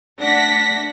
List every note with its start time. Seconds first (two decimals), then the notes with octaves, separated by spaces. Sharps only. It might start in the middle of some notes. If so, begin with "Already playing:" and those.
0.19 A3 D4 F#5 A#6 B6